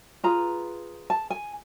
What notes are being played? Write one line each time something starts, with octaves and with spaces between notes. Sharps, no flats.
F4 G#4 B4 A#5
A5
G#5